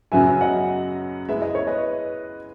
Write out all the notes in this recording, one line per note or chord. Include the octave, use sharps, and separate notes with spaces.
F#2 C#3 F#3 B3 E5 G#5
D#5 F#5
G#3 B3 E4 E5
D#5
C#5
B4 D#5